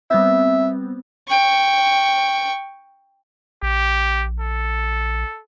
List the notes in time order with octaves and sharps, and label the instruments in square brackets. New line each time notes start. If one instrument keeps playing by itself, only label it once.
[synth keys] G3 B3 C4 [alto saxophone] E5
[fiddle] G5 C#6
[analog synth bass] A#1 [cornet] G4
[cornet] A4